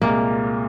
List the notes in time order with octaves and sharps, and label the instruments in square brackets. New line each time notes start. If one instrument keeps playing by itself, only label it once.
[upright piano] C2 A#2 G#3 [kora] A#3